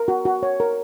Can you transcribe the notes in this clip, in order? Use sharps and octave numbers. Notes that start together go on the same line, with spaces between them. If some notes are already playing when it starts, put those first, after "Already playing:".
Already playing: A#4
F#4
F#4
C#5
A#4